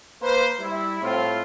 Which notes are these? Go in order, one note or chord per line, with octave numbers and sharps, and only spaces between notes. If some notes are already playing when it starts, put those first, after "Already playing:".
A#3 B4 C5
G3 E4
A2 C4 F4